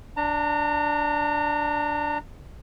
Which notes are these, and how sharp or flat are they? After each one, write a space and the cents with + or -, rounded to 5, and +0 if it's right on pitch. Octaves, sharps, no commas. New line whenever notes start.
D4 +0 A#5 -35